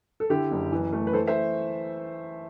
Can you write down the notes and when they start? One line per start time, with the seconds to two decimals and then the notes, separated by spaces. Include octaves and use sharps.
0.20 A4
0.30 D3 E4 G4
0.51 F#1
0.72 E3
0.93 A3
1.07 B4
1.13 E3 A4 C5
1.27 C5 E5